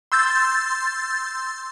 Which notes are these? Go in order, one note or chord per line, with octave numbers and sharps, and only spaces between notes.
C6 E6 G6 A6